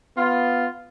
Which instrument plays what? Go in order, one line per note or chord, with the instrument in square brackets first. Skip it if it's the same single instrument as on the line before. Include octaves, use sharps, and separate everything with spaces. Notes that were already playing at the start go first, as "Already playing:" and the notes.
[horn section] B3 F4